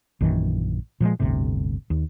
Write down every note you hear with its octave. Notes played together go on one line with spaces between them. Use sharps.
A#1 F#2 D#3 E3
A#2 F3 F#3 G#3
G1 D2 A2 C3
D#2